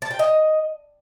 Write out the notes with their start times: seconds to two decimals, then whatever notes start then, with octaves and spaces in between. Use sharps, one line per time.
0.02 A5
0.11 G5
0.19 D#5